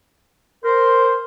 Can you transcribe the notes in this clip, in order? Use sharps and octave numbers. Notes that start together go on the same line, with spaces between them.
A#4 C5